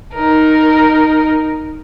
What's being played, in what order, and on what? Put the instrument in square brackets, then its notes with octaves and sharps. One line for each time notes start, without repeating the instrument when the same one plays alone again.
[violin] D#4 A#4